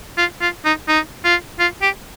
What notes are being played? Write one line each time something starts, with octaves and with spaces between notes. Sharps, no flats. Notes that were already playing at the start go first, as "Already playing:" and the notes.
F4
F4
D#4
D#4
F4
F4
G4